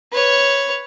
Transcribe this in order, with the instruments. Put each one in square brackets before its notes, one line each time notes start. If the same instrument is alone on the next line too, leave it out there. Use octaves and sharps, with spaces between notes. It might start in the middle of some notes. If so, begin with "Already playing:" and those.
[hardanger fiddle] B4 C#5